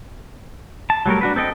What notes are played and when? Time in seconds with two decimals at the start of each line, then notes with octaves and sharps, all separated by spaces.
0.90 A5
1.06 F#3 G3 A3 A#4
1.21 D4 F#4 B4
1.36 C4 A4 D#5 G5